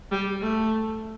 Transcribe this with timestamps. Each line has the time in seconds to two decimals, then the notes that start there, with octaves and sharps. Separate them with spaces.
0.12 G3
0.41 A3